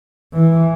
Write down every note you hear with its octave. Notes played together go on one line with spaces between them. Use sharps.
E3